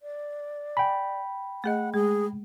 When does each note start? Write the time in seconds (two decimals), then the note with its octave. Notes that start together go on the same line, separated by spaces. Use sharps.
0.01 D5
0.77 G5 G#5 B5
1.64 A3 G#4 D#5 F#5
1.94 G#3 G#4